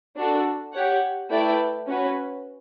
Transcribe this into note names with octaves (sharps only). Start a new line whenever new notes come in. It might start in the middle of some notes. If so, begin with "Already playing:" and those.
D4 F#4 A4
G4 C#5 F#5
A3 E4 B4 D5 G5
C#4 F#4 B4